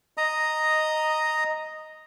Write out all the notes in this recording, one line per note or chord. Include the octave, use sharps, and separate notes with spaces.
D#5 A#5 D#6